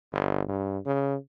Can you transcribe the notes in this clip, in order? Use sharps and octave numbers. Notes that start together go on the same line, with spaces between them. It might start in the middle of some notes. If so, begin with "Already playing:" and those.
G1
G2
C#3